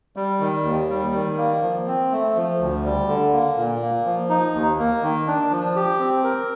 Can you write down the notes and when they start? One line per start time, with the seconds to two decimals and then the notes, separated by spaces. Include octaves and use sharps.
0.16 G3
0.40 D#3
0.65 D#2
0.90 G3
1.14 D#3
1.38 A#3
1.63 F3
1.87 C4
2.12 A3
2.36 F3
2.60 D2
2.84 G3
3.08 D3
3.33 A#3
3.57 A#2
3.82 A#3
4.06 F3
4.30 D#4
4.55 D#2
4.79 A#3
5.03 D#3
5.27 D4
5.51 F3
5.76 G4
6.00 C4
6.24 A#4